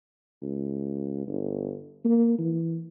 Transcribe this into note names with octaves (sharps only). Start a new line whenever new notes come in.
C#2
G1
A#3
E3